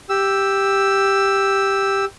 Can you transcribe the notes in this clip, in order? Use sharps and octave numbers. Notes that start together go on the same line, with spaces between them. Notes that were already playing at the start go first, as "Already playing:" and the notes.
G4 E6